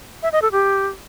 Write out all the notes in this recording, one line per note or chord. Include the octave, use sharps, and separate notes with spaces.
E5
D#5
A4
G4